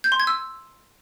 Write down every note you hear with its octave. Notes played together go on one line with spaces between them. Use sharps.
G6
C6
G#6
E6